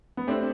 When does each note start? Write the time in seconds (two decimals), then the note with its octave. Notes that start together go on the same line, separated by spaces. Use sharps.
0.17 B3
0.27 A3 C4 D4 G4 C5